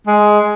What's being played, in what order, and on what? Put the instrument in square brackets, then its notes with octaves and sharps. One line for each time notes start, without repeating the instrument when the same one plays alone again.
[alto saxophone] G#3